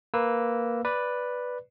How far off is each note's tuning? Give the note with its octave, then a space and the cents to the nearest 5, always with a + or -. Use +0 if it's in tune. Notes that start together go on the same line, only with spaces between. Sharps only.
A#3 +0 B4 +0 E6 +0
B4 +0 D5 +0